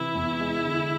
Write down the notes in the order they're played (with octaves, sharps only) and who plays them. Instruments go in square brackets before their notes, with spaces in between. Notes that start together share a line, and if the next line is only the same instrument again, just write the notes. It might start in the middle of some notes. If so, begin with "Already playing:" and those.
Already playing: [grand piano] C3 E3 [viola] E4
[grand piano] E2
G#3
D3